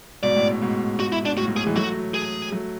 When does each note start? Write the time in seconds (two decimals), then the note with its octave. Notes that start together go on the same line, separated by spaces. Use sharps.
0.23 G#2 B2 D5
0.36 A2
0.49 A2
0.61 G#2 B2
1.00 F#4
1.12 E4
1.25 D4
1.37 A2 F#4
1.48 G#2
1.56 A2 G#4
1.67 E3 G#3
1.76 F#3 A3 F#4
2.14 G#4
2.52 F#3 A3